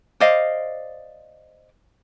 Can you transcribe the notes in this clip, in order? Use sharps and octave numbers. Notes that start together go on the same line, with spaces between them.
C5 D5 D#5 F5